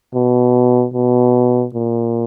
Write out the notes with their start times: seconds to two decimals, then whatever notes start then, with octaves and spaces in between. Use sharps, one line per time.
0.14 B2
0.94 B2
1.74 A#2